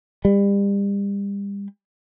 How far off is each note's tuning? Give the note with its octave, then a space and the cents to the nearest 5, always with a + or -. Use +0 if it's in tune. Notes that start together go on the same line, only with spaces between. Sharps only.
G3 +35